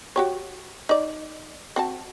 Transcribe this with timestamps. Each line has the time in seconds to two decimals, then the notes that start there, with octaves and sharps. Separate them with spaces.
0.16 F#4 G4 C#5
0.89 D#4 D5
1.76 C4 F#4 A5